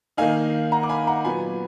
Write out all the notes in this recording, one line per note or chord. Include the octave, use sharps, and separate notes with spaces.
D#3 A#3 D#4 F5 G#5
F#5 A#5
D6
G#5 B5
F#5 A#5
A#2 F#3 B3 G#5 B5